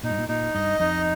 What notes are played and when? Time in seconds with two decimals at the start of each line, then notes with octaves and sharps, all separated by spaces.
0.03 A#2 D#4
0.10 G2
0.18 A#2
0.29 A#2 D#4
0.55 G2 D#5
0.80 F2 D#4